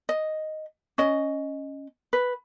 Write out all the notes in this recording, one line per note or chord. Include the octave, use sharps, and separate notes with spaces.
D#5
C#4 D#5
B4